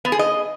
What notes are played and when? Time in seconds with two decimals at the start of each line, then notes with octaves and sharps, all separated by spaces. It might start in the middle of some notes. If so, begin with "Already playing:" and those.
0.05 B3
0.12 G#4
0.19 D#5